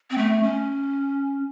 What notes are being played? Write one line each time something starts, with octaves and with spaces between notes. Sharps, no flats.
C4
A3
C#4